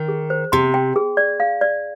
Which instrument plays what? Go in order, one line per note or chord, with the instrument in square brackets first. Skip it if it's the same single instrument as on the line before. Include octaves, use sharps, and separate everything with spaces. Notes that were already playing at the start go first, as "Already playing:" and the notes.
Already playing: [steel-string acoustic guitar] D#3
[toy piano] G#4
C5
[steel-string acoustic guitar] C3 [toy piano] C6
[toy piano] G5
G#4
D5
F5
D5